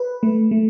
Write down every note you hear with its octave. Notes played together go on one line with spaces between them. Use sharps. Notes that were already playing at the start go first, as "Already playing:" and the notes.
Already playing: B4
A3
A3